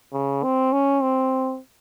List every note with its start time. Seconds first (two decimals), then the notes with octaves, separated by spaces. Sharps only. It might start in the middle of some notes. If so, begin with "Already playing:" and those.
0.13 C#3
0.43 C4
0.72 C#4
1.02 C4